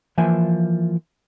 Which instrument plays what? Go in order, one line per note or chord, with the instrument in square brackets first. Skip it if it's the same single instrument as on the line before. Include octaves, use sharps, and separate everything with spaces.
[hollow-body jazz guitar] E3 F3 A#3 E5 G#5